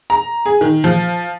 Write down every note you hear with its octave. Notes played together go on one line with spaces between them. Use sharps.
A#5
G#4
D#3
F3